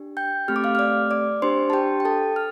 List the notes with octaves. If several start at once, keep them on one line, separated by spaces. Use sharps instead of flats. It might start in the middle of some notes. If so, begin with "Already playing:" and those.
Already playing: D4 G4
G5 G6
A3 C4 G4 F6
D6
F5 F6
F6
D5 D6
D5 D6
D4 G4 C5 C6
A5
G4 G5
G5
A4 A5
F6